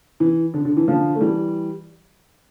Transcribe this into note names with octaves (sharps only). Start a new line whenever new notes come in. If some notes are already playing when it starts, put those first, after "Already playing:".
E3
D3
D3
E3
D3 F3
A3
E3 G3